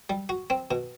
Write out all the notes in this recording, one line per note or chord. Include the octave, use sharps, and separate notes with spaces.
G3
F#4
C4
B2